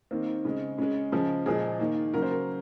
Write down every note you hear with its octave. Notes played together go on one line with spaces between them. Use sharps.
D#3 A#3 C4
C#3 G#3
C#3 G#3 C#4
C#3 F3 G#3
A#2 F3 G#3 G#4
D#3 A#3
C#3 F#3 A#3 A#4
C5
A#4